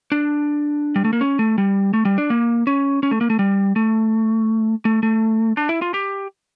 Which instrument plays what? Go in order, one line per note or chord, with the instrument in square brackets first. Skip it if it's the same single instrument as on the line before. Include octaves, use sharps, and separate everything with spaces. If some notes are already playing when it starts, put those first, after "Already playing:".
[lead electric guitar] D4
G3
A3
A#3
C#4
A3
G3
A3
G3
D4
A#3
C#4
C#4
A3
A#3
A3
G3
A3
A3
A3
D4
E4
F4
G4